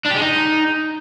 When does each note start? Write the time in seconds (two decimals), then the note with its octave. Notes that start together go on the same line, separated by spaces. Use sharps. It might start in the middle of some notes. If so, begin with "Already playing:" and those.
0.06 D4
0.11 G4
0.16 G#3
0.22 D#4